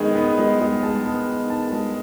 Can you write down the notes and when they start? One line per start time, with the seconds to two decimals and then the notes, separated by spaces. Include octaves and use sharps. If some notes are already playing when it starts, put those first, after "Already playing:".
Already playing: D#3 G#3 B3
0.15 B3
0.38 G#3
0.60 G#3
0.83 G#3 A5
1.05 B3
1.28 D#3
1.49 D#3 A5
1.72 G#3